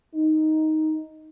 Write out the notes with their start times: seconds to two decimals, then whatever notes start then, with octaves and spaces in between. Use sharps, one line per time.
0.15 D#4